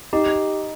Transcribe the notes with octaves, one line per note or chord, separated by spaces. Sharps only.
D#4 G4